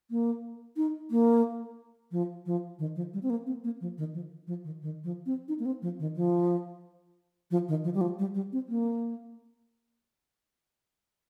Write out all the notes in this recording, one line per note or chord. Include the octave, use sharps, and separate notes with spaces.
A#3
D#4
A#3
F3
F3
D#3
F3
G3
C4
A#3
C4
A#3
F3
D#3
F3
F3
D#3
D#3
F3
C4
D#4
A#3
C4
F3
D#3
F3
F3
D#3
F3
G3
F3
G3
G3
C4
A#3